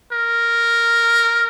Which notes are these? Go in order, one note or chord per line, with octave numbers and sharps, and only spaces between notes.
A#4